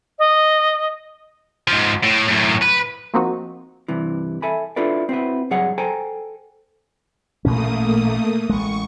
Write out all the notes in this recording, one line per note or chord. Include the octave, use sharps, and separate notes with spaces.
D#5
G#2 F3
A2
F#2 A2
B4
F3 A#3 C4 D#4 F#4
G2 C3 E3
A4 E5 G#5 B5
D4 E4 F4 A4 B4 D5
C4 E4 F#4 B4
G2 F#3 G#4 C#5 F#5
A4 C5 G5 G#5 A#5
A1 A#2 A3 A#3 C#4 D#6
A1 G#3 C#6